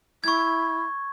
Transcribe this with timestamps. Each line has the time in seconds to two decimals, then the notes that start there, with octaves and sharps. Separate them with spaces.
0.24 E4 C#6 G#6